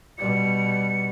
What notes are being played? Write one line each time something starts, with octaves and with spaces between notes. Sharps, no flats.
B2 G3 C#7